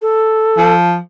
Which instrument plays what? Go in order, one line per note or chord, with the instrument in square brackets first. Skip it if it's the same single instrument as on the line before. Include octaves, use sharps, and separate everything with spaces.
[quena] A4
[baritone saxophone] F3